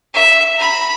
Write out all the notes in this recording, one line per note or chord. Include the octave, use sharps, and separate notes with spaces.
E5
A#5 B5